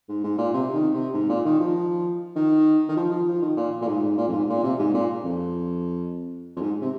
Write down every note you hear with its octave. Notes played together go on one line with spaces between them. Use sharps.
G#2
G#2
A#2
C3
D#3
C3
G#2
A#2
D#3
F3
D#3
D#3
F3
F3
F3
D#3
A#2
A#2
G#2
G#2
A#2
F2
G#2
A#2
C3
G#2
A#2
F2
F2
G#2
C3